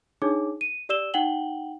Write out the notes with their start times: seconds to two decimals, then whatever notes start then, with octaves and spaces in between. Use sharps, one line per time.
0.22 D4 D#4 G#4 C#5 D6
0.61 D#7
0.89 G4 D5 E6 E7 G7
1.14 D#4 F#5 G5 F#7 G7